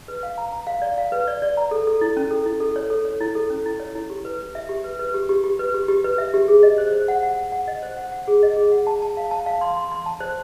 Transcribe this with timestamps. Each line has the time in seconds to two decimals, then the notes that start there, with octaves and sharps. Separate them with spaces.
0.08 B4
0.23 F5
0.38 A#5
0.52 A#5
0.67 F5
0.82 D5
0.98 F5
1.12 B4
1.28 D5
1.42 D5
1.57 A#5
1.71 A4
1.87 A4
2.01 E4
2.17 C#4
2.31 A4
2.46 E4
2.60 A4
2.76 C#5
2.90 A4
3.05 C#5
3.21 E4
3.35 A4
3.50 C#4
3.66 E4
3.80 C#5
3.95 E4
4.10 G4
4.25 B4
4.40 B4
4.55 E5
4.69 G4
4.84 B4
4.99 B4
5.14 G4
5.29 G4
5.44 G4
5.59 B4
5.74 G4
5.88 G4
6.04 B4
6.18 E5
6.34 G4
6.48 G#4
6.63 D#5
6.78 C5
6.93 C5
7.08 F#5
7.23 F#5
7.38 F#5
7.52 F#5
7.67 D#5
7.83 C5
7.97 F#5
8.12 F#5
8.28 G#4
8.43 D#5
8.57 G#4
8.71 F#5
8.87 A5
9.02 A5
9.17 F5
9.31 A5
9.46 F5
9.61 C6
9.77 C6
9.92 C6
10.06 A5
10.20 C5